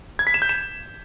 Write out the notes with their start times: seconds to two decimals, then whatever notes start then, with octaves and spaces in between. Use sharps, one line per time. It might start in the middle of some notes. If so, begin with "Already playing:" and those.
0.19 G#6
0.27 B6
0.34 E7
0.42 G6
0.49 E7